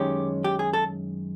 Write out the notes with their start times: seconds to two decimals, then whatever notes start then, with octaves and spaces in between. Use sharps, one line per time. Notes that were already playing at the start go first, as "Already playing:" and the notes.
Already playing: F#2 D#3 G#3 C#4 G4
0.44 G4
0.59 G#4
0.73 A4